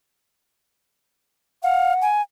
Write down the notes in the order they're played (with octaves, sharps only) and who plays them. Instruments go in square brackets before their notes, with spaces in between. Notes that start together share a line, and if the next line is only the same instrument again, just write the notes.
[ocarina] F5 [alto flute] F#5
[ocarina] G#5